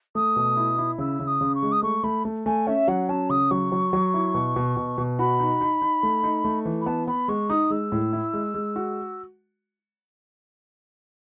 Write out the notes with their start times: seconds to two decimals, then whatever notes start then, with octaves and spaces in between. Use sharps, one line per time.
0.15 A3 D#6
0.36 B2
0.57 E4
0.78 E4
0.98 C#3 E6
1.19 C#3
1.27 D#6
1.41 C#3
1.55 C#6
1.63 G#3
1.72 D#6
1.83 A3 C#6
2.03 A3 B5
2.25 A3
2.46 A3 G#5
2.67 C#4 E5
2.88 F#3 F#5
3.09 C#4 A5
3.29 C#3 D#6
3.51 F#3 C#6
3.72 F#3
3.93 F#3
4.14 E4
4.34 B2
4.56 B2
4.77 B2
4.98 B2
5.19 F#4 B5
5.40 D#4
5.61 D#4
5.82 D#4
6.03 A3
6.24 D#4
6.45 A3
6.65 E3
6.81 B5
6.86 B3 A5
7.07 B3 B5
7.28 G#3 C#6
7.50 D#4 D#6
7.70 G#3 E6
7.92 A2
8.13 E4
8.33 G#3
8.54 G#3
8.76 F#4